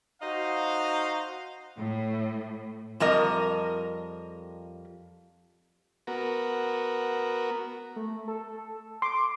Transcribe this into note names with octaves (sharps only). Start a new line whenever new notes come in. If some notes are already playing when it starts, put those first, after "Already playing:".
D#4 F#4 C5 D#5 F5
A2
F2 G3 A#4 D#5
B3 F#4 A#4
A3
A4
C6 D6